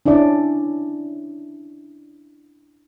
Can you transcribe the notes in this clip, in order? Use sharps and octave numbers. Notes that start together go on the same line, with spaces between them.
C#4 D4 E4 D5